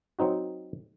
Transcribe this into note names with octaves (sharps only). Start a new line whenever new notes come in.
F#3 C4 D#4 F#4